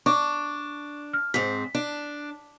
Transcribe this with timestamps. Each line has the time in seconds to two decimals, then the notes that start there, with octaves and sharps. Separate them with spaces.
0.06 D4 C#6 D6
1.13 F6
1.34 G#2 C4 B6
1.75 D4